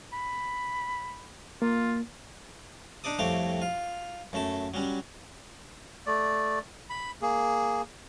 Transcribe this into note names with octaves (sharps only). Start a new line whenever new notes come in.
B5
A#3 F4
D4 D#4 D5 D#6
C2 F2 A3 C4 C#5 D6
F4
F#2 A3 A5
F#3 G3 C#4
A3 D5
B5
A#3 G#4